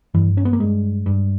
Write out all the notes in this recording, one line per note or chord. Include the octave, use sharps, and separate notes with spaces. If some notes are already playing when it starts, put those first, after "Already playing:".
G2 E3
C#4
B3
A#3
G2 G#3
G2